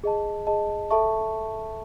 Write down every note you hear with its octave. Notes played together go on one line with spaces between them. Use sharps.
G#4 D#5 A5
G#4 D#5 A5
A4 E5 A5 C#6